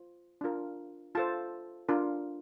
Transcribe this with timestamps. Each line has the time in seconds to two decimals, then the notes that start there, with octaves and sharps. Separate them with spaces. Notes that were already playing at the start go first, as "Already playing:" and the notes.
Already playing: F4 C5
0.41 D4 F4 A#4
1.15 F4 A4 C5 A5
1.89 D4 F4 A#4